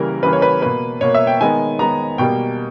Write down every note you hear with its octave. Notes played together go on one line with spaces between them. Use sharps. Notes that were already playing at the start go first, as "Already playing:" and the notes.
Already playing: C#3 E3 G3 A#3 A#4
C#3 E3 G3 A#3 B4
C#5
B4
B2 A#3 B4
B2 A#3 C#5
E5
G5
D#3 G#3 B3 G#5
D#3 G#3 B3 A#5
B2 G3 A#3 G5